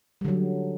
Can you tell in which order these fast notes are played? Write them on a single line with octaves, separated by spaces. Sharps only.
G3 D3 F#3